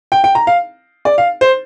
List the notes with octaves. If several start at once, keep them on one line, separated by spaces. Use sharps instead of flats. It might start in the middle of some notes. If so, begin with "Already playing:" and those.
G5
G5
A#5
F5
D5
F5
C5